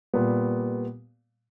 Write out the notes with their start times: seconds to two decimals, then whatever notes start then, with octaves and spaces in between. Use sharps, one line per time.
0.14 A#2 G3 B3